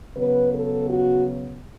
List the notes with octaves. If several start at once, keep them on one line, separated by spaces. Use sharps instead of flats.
C#3 F#3 B3 B4
A4
F#4